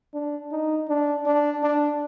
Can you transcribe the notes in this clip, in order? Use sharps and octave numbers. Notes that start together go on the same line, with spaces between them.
D4
D#4
D4
D4
D4